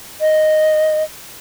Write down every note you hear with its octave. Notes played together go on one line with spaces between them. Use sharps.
D#5